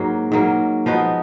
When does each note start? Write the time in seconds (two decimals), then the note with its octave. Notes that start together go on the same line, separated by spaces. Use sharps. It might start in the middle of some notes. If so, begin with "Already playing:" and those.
Already playing: G#2 F#3 A#3
0.32 G#2 F#3 A#3
0.86 F3 B3 D#4 F#4